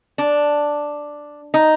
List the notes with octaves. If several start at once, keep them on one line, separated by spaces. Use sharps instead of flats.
D4
D#4